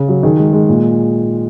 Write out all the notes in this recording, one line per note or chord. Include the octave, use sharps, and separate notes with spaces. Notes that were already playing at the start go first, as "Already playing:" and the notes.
Already playing: C#3
F#3
D#3 G#4
G#3
G#3
A#2